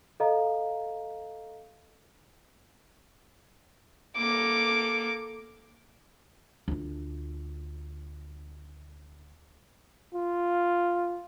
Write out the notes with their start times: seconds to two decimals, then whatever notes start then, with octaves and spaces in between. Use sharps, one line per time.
0.20 A4 D#5 F5 A#5
4.17 A#3 A4 D6
6.68 D2 F4
10.14 F4